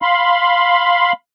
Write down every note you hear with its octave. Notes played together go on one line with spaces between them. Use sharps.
F5 B5 C6